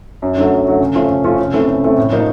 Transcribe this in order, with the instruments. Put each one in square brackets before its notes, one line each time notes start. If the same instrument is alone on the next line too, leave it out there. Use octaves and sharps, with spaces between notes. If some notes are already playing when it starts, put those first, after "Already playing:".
[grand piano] F#2
D3 F#3 A3
F#2
D3 F#3 A3
C#3
F3 A3 C#4 F4
C#3
F3 A3 C#4 F4
C#3
E3 A3 C4
C#3
E3 A3 C4
A2
F3 A#3 D#4